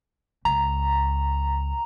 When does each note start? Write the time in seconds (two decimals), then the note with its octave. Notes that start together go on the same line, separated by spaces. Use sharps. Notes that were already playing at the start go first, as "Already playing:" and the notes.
0.45 C#2 A#5